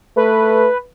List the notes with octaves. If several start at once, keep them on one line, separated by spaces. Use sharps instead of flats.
A3 B4